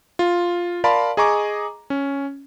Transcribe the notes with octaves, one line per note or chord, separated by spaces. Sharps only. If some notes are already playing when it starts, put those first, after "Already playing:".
F4
A#4 D5 F5 A5 B5 C6
G#4 D#5 G#5 A#5 C#6 D6
C#4